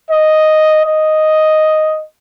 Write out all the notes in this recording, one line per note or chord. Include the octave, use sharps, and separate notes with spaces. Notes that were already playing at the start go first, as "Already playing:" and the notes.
D#5
D#5